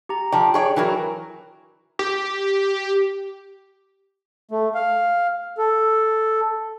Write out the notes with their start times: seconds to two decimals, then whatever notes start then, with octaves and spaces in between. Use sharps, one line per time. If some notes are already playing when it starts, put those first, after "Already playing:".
0.09 G4 A#5
0.32 F3 D5 G5
0.54 G#4 C#5 D5
0.76 E3 F#3 A#4
1.99 G4
4.51 A3
4.75 F5
5.58 A4